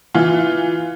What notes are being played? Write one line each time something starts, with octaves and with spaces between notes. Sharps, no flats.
E3 F4